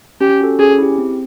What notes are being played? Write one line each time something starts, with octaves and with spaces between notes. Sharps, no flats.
C#4 G4
F#4 A4
C#4 G#4
E4 G4
C4